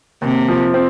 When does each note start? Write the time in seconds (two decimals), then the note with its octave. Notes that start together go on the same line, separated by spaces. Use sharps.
0.22 D#2 C3
0.48 F3
0.74 C4